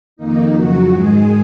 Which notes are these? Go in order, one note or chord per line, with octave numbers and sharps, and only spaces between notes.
F2 D#3 A#3 D#4
F2 C#3 F#3 F#4
G#2 D#3 G#3 G#4